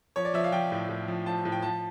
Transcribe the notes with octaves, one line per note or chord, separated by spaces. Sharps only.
F3 C#5
D5
F3 E5
F5
F3 G5
A2
A2
F3
F3 A5
A2
G5
F3 A5